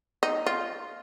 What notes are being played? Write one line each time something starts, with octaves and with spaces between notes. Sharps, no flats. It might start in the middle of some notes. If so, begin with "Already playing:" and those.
D#4
F4